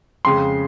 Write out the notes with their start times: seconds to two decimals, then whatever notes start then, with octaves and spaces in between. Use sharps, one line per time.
0.25 F2 C#3 G#3 C6